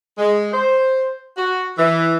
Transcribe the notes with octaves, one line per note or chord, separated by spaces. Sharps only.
G#3
C5
F#4
E3